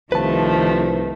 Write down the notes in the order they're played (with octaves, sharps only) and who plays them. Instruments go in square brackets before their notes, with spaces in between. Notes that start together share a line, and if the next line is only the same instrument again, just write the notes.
[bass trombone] C2 [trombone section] G2 F3 [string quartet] D#3 A3 [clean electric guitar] B4 A5